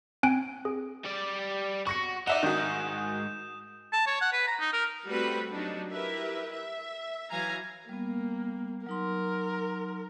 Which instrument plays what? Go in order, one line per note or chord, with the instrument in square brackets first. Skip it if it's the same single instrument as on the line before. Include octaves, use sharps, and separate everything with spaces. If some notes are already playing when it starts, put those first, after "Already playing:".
[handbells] C4 G#5 F#6 D7
G#4
[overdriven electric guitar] G3 D5
[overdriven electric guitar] F#4 [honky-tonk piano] C#6 A#6 C#7
[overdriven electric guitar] D#4 [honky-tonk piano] D5 E5 F#5 [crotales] E7
[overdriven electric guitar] G#2 [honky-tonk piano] D#3 F#4 [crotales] D#6 G6
[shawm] A5
C#5
F#5
B4
A#5
D#4
A#4
[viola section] G3 A3 C4 F#4 B4 F#5
F#3 G3 D4 D#4 F#4
E4 G4 A#4 B4 E5
E5
E3 F#3 F5 G#5 A#5
[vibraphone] G3 B3 [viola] A#3
[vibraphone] F#3 D#4 C6 [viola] A#4